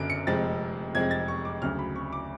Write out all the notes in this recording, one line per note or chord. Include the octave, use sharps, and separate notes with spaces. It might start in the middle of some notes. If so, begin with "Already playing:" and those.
Already playing: F#1 F#2 D3 F#3 D7
C#7
F1 F2 F3 G#3 A6
F1 F2 F3 G#3 G#6
A6
C#6
D6
D2 C#3 F#3 F6
B5
C#6
D6